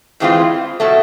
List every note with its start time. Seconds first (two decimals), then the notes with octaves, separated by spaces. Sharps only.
0.20 A2 E3 G#3 C4 F4
0.80 B2 F#3 A3